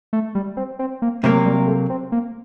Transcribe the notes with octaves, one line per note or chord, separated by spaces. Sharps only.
A3
G3
C4
C4
A#3
C3 F#3 A3 A#3
G3
A3
C4
A#3